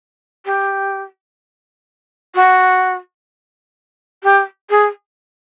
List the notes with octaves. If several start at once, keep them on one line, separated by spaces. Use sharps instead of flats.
G4
F#4
G4
G#4